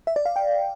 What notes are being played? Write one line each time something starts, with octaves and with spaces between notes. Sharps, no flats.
E5
D5
F5
G5